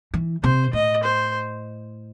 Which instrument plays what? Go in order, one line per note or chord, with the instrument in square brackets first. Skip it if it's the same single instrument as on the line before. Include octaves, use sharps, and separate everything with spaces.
[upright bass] E3
[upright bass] C3 [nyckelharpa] C5
[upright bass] A2 [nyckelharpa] D#5
[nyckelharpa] C5